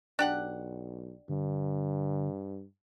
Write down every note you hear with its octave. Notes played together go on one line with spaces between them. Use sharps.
B1 D4 G4 F#5
G2 D3